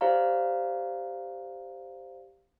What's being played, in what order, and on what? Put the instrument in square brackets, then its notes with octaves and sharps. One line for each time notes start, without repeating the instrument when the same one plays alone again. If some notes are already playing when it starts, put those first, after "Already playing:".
[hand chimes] G4 C5 D5 F5 A#5